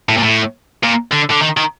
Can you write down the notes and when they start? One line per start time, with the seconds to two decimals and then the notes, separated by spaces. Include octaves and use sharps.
0.09 A2
0.18 A#2
0.23 A2
0.84 A#2
1.13 D3
1.31 D3
1.43 D#3
1.57 D#3